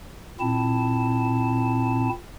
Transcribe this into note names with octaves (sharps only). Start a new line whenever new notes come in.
A#2 C4 E4 A5